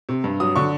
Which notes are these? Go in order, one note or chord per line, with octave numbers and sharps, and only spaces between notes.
C3
G2
F#3 D#6
D3 C#6